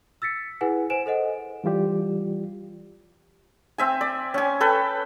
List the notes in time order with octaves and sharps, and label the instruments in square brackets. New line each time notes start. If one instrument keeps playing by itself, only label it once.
[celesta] E6 A6 B6 C#7
E4 G#4 B4 F#5 G#5
C5 G#5 D7 E7
A4 C5 D#5 F#5
[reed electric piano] E3 G3 F4 G4 D5
[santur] C4 E5 G#5
D5
C#4 G#5
A4 B4 G5